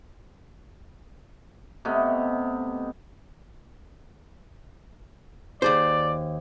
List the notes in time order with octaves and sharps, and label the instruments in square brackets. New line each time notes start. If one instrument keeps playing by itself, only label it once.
[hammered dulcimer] C3 A3 B3 D#5
[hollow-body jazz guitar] D#2 G#4 C5 [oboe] D5